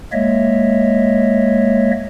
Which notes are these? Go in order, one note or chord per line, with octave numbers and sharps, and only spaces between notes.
G#3 A#3 C#5 D#5 E5